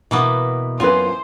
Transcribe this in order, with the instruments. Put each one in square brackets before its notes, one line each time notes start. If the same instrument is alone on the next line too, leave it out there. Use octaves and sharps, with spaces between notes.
[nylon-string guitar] B2 [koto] E3 A#3 B3
[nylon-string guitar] F#2 B3 C4 [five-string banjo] F4 B4 [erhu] C5 [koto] G#5